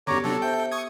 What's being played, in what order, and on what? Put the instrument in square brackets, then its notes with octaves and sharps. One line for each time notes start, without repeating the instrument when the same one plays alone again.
[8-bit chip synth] F#2 D3 [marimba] B3 G4 [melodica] C#5 A#5 D6
[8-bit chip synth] C3 F#3 D4 [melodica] A4
[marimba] C5 E5 G6 [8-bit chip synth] G5
[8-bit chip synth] C#6 D#6 G#6